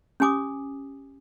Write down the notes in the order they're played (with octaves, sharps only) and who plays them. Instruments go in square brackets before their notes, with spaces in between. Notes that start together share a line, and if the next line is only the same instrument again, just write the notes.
[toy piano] C#4 G4 G#5 D6 D#6